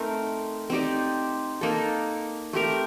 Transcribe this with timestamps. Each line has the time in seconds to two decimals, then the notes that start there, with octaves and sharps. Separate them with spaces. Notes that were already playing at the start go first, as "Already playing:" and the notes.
Already playing: A3 C4 D#4 A#4
0.70 C4 D#4 G4 D5
1.61 A#3 D#4 A4
2.53 A3 C4 G4 A#4